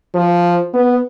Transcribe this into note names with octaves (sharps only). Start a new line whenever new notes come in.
F3
B3